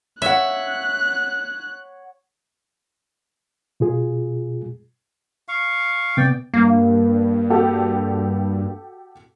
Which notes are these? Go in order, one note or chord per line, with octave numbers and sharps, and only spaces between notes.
C#5 E5 F#5 F#6
B2 F4 G#4
F5 C#6
C3 B3 D5 G5
G2 A#3
F#4 G4 A4